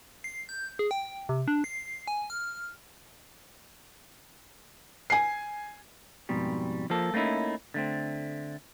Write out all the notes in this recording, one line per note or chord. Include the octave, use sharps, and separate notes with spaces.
C7
G6
G#4
G5
C3
D4
C7
G#5
F6
G#5 C7
F2 G#2 B2 G3
F3 A#3 A4
A3 A#3 C#4 D#4 E4
D3 A3 C4